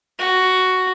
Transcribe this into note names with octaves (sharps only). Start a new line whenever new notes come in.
F#4